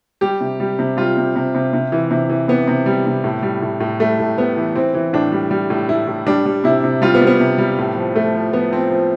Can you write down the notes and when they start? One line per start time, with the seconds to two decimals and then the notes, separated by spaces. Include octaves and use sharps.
0.21 G3 G4
0.41 C3
0.60 G3
0.79 C3
0.97 G3 F4
1.17 C3
1.36 C3
1.55 C3
1.73 C3
1.92 E3
2.11 C3
2.29 E3
2.48 C3 B3
2.67 C3
2.86 G3
3.06 C3
3.24 A2
3.43 G3
3.62 A2
3.80 A2
4.00 G3 A3
4.19 A2
4.37 G3 B3
4.57 E3
4.75 E3 C4
4.94 E3
5.13 A2 D4
5.32 G3
5.51 G3
5.70 A2
5.89 A2 E4
6.07 A2
6.27 G3 D4
6.46 G3
6.64 C3 E4
6.84 C3
7.02 G3 F4
7.15 B3
7.22 G3
7.27 B3
7.40 C3
7.58 G3
7.78 A2
7.96 F3
8.16 F3 A3
8.35 F3
8.53 F3 B3
8.72 F3 C4
8.91 F3